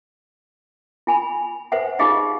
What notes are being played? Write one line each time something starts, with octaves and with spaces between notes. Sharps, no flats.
F4 G#5 B5
B4 C5 E5 F#5
D#4 F4 G4 G#4 D#5 F5